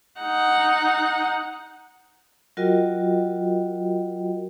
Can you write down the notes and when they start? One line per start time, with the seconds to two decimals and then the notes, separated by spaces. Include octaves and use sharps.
0.21 D#4 F#5
2.57 F#3 F4 F#4 A#4 D#5 G5